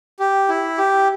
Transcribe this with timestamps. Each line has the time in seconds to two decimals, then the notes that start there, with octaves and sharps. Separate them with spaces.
0.20 G4
0.49 E4
0.78 G4